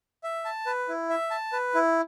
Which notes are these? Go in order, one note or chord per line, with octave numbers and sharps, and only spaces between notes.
E5
A5
B4
E4
E5
A5
B4
E4